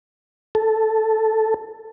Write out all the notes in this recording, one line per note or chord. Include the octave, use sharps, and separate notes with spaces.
A4